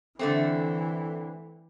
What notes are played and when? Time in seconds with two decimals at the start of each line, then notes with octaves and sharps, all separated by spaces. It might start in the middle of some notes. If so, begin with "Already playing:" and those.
0.19 D3 E3 A3 C4